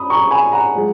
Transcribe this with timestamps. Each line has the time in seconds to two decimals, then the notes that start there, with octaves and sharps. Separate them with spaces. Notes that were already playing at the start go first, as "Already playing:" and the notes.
Already playing: F#2 B5 D#6
0.10 A#5 C#6
0.30 G#5 B5
0.52 F#5 A#5
0.75 F3 G#3